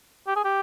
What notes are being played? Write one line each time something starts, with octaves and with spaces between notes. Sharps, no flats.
G4
G#4
G4